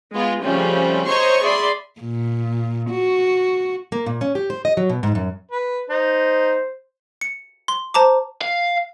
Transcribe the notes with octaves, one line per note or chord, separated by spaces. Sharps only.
G#3 B3 F4 G#4
C#3 F3 G3 A3 C4 C#4
C5 C#5 D#5 A#5 C6 C#6
G#4 D5 E5 B5 C6
A#2
F#4
A#3
A#2
C#4
G4
C5
D#5
F#3
B2
G#2
F#2
B4
D#4 C5
C#7
C6 G7
C5 A5 A#5 D6
F5